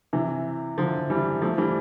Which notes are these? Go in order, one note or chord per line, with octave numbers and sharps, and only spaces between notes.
C3 E3
D3 F3
E3 G3
F3 A3
E3 G3